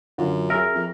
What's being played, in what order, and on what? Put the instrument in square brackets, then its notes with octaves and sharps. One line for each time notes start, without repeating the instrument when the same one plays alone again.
[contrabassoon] F#2 [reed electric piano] D3 F4 F#4
[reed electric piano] G#4 E5 [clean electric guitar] A#4
[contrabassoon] F2